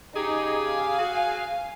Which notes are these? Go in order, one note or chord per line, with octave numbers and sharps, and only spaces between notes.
C#3 D#4 G4 G#4
F5 G#5
F#4 G#4